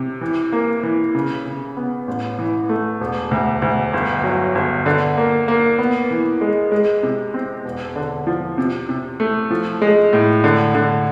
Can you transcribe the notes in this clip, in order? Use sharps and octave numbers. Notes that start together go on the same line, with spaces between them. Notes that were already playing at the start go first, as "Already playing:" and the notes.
Already playing: C3
E3
A#3
E3
C#3
C#3
B3
A1
E3
A3
E1
D2
D2
G1
F#3
G1
D3
A#3
A#3
B3
E3
G#3
G#3
C3
C4
E1
D3
F3
C3
C3
A3
F3
G#3
A2
D3
D3